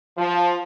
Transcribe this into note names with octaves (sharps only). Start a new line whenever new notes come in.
F3